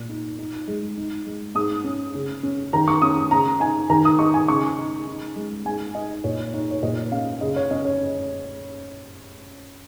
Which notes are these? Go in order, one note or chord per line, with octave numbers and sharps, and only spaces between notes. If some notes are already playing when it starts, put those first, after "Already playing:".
Already playing: A#2
D#4
D#4
G#3
D#4
G#3
G#2 D#6
C#4
C#3
C#4
D#3 A#5
C#6
C#4 D#6
C#3 A#5
D#4 G#5
D#3 A#5
D#6
D#4 C#6
G#5
C#3 C#6
D#4
D#4
G#3
G#2 G#5
D#4 D#5
A#2 C#5
D#4 C#5
C#5
A#2 D#5
C#4 F5
C#3 D#5
C#5
C#4 D#5
C#5